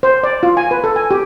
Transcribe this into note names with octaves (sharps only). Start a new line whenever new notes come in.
C5
D5
F4
G#5
B4
A4
G#5
G4